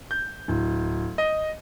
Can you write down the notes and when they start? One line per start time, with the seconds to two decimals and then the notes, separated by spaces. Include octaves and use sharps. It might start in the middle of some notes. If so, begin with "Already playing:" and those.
0.11 G6
0.48 D1
1.18 D#5